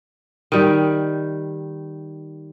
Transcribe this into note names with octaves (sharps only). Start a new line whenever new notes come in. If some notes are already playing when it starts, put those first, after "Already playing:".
D#3 G3